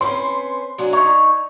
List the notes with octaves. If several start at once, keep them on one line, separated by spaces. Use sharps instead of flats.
C4 C#4 B4 C6
F#3 D4 G#5
D#4 C#5 A#5